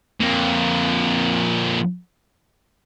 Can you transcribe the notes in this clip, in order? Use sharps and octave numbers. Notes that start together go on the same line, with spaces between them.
F2 A#3